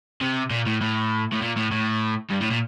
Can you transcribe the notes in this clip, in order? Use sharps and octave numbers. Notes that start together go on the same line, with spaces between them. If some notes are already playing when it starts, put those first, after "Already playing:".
C3
A#2
A2
A2
A2
A#2
A2
A2
G2
A2
A#2